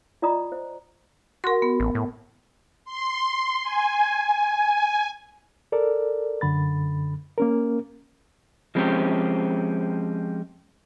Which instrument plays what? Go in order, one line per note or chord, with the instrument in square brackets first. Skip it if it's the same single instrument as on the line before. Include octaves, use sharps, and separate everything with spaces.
[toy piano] F4 D5 D#5 A#5 D#6
C5
[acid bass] F#4 [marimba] A#4 C6
[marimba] B3
[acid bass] A1
A2
[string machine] C6
G#5
[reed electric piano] A4 A#4 D5
F#2 D3 B5 A6
A#3 C#4 A#4
[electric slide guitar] F3 G#3 C4 C#4 G4